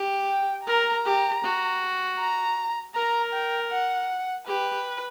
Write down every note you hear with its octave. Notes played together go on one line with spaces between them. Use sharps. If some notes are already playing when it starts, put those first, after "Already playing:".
Already playing: G4
G5
A#4 A#5
G4
F#4
A#5
A#4 A#5
G5
F#5
G4 B4